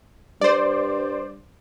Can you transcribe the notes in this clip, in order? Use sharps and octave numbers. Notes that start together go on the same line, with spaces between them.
G2 C5 D5